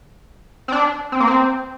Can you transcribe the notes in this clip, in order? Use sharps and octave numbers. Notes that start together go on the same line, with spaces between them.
C4
D4
C4
A#3
C4